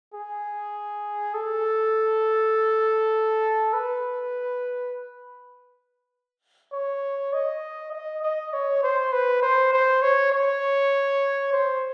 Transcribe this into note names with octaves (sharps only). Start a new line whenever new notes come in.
G#4
A4
B4
C#5
D#5
D#5
D#5
C#5
C5
B4
C5
C5
C#5
C#5
C5